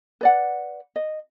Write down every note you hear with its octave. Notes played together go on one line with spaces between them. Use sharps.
B4 D5 F#5
D#5